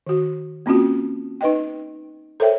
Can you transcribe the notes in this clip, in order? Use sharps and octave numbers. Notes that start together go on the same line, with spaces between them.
D#3 F#4
A#3 C4 C#4 F4 F#4
D#4 B4 D#5 G5
A4 A#4 C5 C#5 E5 G5